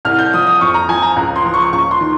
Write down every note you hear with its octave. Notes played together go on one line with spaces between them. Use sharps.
C2 F6
G6
F3 D#6
D#6
F2 C#6
A#5
F3 G#5
A#5
C#2 A#5
C6
F3
C#6
C#2 C#6
C6
D#3